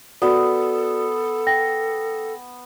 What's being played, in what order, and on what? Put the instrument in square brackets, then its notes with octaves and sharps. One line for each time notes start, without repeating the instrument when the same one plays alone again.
[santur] B3 [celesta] F#4 D5 [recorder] A4
[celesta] G5 A#6